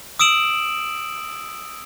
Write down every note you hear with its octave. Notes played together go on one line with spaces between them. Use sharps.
D#6 E6 D7 E7 F#7